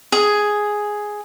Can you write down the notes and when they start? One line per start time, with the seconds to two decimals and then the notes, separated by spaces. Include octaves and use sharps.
0.12 G#4